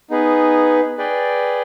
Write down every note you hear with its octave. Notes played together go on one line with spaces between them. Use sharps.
B3 D#4 G#4 B4
G#4 B4 D5 G5